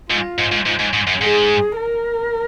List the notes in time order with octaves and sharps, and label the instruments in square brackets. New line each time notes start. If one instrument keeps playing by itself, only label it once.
[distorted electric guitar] G#2 [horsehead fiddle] F4
[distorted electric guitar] G#2
G#2
G#2
G#2
G#2
F#2
[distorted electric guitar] G#2 [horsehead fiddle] G#4
[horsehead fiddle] A#4